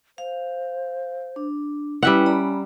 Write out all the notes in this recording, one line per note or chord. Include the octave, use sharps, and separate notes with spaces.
C5 F5
D4
G3 C#4 E4 B4 E5 F#5 G5
D5 A#5 B5